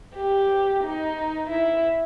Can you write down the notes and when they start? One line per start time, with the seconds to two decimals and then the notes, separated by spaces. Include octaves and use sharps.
0.16 G4
0.83 D#4
1.50 E4